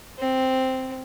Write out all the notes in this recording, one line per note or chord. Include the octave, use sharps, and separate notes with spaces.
C4